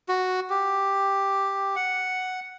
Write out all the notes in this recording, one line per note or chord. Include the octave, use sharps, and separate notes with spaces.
F#4
G4
F#5